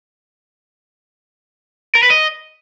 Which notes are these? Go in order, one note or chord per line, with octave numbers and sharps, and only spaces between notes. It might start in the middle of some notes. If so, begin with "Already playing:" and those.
A#4
B4
D#5